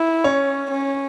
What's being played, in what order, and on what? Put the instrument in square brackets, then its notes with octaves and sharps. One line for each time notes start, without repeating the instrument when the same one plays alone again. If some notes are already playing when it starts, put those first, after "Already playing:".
Already playing: [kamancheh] E4
[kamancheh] C#4 [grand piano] C#5
[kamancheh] C#4